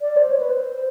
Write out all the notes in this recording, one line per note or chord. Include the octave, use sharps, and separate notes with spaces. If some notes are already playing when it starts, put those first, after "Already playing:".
D5
C5
C#5
B4
C5